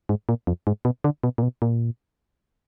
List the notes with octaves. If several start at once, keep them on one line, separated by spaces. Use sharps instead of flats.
G#2
A#2
F2
G#2
B2
D3
B2
A#2
B2
A#2